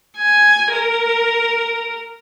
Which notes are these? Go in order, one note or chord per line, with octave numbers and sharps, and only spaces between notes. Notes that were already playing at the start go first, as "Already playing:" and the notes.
G#5
A#4